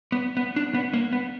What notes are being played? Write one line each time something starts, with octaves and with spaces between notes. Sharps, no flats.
B3
B3
D4
B3
A#3
B3